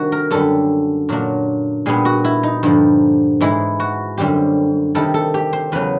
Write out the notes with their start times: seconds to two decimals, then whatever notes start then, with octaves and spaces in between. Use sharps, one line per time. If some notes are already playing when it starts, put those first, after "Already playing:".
Already playing: C3 D#3 G3 A#3 D4 F#4
0.12 A#4
0.30 F#2 D3 G3 A4
1.09 A#2 F#3 A#3 D4
1.86 A#2 G3 B3 D4 G#4
2.05 F#4
2.24 E4
2.43 D#4
2.63 G2 D3 F3
3.40 G#2 E3 G#3 E4
3.80 F#4
4.18 F#2 D3 G3 C4 G4
4.95 C3 D#3 G3 A4
5.14 A4
5.34 G4
5.53 C5
5.72 E2 C#3 F#3 B4